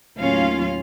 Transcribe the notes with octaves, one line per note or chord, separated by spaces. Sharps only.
D#2 A2 F#3 C#4 F4 F5